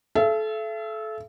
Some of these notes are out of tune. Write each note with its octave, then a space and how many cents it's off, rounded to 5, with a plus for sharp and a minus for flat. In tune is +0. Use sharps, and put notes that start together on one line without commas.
A4 -25 E5 +40